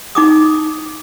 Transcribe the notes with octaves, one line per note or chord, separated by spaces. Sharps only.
D#4 D6 D#6